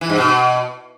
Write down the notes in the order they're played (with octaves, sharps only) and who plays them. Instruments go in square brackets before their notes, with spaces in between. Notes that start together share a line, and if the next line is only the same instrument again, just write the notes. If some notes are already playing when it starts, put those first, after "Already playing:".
[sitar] E3
G2
B2